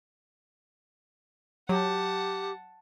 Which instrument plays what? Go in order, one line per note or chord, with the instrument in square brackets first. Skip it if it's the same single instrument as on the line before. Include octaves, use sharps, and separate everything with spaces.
[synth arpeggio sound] F#3 [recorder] G4 [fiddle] F#5 A5